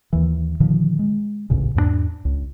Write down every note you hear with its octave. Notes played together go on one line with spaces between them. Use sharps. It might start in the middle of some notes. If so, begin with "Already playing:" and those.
D#2 E3
A#2 D3 D#3 F3
G#3
A1 D2 A#2 C#3
E2 G#2 G#3 D4
C#2